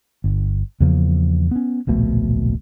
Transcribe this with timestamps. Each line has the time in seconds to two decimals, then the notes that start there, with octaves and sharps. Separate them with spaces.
0.24 G1
0.80 E2 C#3 F3 A#3
1.51 B3 C#4
1.87 D1 A#1 B2 A3